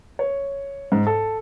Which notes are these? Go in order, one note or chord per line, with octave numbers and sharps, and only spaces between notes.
C#5
G#2
A4